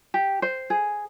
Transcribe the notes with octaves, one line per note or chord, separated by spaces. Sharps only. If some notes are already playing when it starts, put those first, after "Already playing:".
G4
C5
G#4